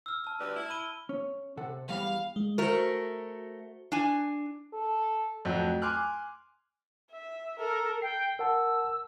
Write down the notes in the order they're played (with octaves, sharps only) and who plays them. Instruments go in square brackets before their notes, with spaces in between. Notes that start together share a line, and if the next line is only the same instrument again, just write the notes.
[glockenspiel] E6 F6
A5 F6
[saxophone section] D2 G3 B4
E4
[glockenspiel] B5 D#7 G7
[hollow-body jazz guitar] C#4
C3 A4 F#5
[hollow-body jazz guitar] E2 G3 B5 [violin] F5
[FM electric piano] G#3
[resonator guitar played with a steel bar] A3 A#4 [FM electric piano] F#4 C5
[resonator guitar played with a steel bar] D4 G#5
[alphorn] A4
[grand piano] F2 F#3 A3
G#5 C6 D6 F6 F#6
[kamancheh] E5
A4 A#4
[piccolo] G5 [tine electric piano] C7
[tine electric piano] A#4 F#5 A5 [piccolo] E6